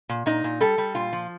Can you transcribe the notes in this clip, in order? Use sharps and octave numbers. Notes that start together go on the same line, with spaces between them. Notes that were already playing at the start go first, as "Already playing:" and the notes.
A#2
A#2 D#4
A#2
G3 A4
G3
A#2 F4
F3